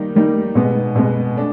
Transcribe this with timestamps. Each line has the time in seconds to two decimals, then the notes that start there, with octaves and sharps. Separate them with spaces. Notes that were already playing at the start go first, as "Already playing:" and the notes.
Already playing: D#3 G3 A#3 D#4
0.15 D#3 G3 A#3 D#4
0.55 B2 G#3 B3
0.95 B2 G#3 B3
1.36 A3 D4